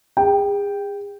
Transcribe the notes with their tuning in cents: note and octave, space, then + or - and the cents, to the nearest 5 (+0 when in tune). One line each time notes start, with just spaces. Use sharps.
G#4 -40 G5 +0